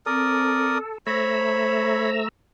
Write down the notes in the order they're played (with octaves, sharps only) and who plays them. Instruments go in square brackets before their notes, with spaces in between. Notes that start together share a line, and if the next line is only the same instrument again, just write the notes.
[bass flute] C4 [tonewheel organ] A4 [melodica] A#4 D5 D#6
[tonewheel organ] A3 A#5 E6 [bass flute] C5 [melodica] C#5 B5